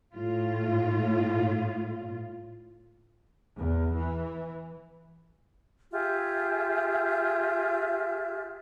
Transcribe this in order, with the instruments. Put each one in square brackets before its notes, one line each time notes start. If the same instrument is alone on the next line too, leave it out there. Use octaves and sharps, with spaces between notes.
[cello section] A2 F4
[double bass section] E2
E3
[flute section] F4 G4 G#4 E5